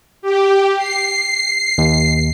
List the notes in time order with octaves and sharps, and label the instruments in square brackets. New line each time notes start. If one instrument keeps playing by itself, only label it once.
[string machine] G4
C7
[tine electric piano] D#2